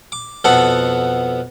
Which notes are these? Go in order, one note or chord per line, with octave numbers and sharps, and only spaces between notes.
D6
F2 B2 B3 A4 F#5 A5